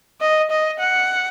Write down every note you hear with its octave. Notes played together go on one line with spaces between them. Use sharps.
D#5
D#5
F#5